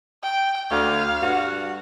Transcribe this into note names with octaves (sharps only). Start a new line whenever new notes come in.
G5
D2 D3 F5
G2 F#4